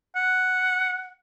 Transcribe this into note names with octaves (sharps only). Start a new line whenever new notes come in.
F#5